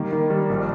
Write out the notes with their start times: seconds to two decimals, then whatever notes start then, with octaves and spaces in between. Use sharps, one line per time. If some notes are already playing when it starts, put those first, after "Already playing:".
Already playing: D#3 G3 A#3
0.13 D#3
0.30 G3
0.50 A#1